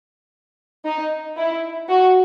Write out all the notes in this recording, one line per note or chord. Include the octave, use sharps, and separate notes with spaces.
D#4
E4
F#4